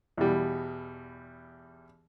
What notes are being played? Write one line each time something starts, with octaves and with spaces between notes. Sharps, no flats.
E2 B2 G3